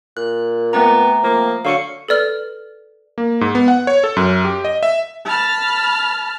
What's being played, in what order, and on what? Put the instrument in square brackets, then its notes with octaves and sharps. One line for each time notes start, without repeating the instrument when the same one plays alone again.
[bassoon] A#2 [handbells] F#6
[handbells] A3 C4 A#5 [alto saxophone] B3
[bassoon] F3 [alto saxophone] A#3
[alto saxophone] D3 [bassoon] F#3 [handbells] F5 C#6 C#7
[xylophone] A4 B4 D5 F6
[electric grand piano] A#3
G#2
B3
F#5
C#5
A4
F#2
G4
D#5
E5
[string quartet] A5 B5 F6